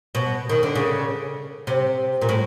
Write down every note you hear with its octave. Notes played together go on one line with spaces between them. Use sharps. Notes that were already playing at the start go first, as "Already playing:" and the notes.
B2
D#3
D3
C#3
C3
A#2
A2